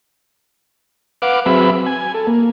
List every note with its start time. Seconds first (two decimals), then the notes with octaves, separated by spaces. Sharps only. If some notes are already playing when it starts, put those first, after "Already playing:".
1.22 B4 F5 F#5 D6
1.46 F#3 C4 G#4 B4 E5 B5
1.86 G#5
2.14 A4
2.27 A#3